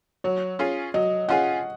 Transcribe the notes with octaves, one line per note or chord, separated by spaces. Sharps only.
F#3 C#5
C#4 F4 G#4
F#3 D#5
C#4 F4 G#4 F#5